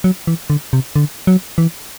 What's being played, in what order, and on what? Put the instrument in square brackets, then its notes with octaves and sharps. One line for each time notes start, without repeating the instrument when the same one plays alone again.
[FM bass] F#3
E3
D3
C3
D3
F#3
E3